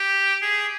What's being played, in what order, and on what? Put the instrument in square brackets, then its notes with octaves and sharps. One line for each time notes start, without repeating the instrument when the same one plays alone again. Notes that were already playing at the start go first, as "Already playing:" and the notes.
Already playing: [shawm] G4
G#4